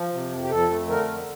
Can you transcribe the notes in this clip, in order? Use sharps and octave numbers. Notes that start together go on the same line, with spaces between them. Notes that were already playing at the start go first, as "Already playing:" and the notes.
Already playing: F3
C3
F2
G4
F2 A4
A3
D3 A#4
F2